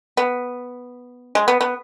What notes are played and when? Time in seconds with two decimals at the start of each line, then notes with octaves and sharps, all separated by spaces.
0.17 B3
1.35 G#3
1.48 B3
1.61 B3